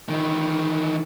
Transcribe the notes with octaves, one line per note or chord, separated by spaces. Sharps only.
D#3 E3